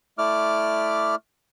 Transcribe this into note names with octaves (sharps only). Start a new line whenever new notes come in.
A3 E4 D5 D6 F6